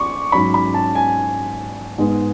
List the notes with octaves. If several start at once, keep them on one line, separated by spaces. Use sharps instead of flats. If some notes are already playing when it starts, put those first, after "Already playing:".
Already playing: C#6 D6
G#2 F#3 C#4 B5
B5
A5
G#5
G#2 G#3 B3